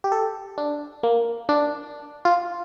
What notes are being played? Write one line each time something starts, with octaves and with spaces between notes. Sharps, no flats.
G4
A4
D4
A#3
D4
F4